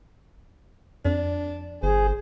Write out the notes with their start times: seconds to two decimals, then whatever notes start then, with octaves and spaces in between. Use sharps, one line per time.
1.05 F2 D4
1.83 G1 G#4 C5